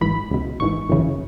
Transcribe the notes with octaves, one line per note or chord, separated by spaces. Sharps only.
G#1 G#2 E3 B5
C#2 B2
G#1 G#2 E3 C#6
G#1 F#2 C#3 E3